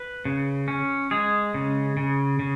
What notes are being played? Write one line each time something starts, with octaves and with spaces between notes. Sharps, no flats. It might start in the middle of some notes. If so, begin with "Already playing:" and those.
Already playing: B4
C#3
C#4
G#3 G#4
C#3
C#3
C#3